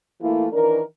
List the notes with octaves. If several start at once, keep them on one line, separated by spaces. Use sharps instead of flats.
E3 A3 A#3 E4 F4
D#3 E3 D4 A#4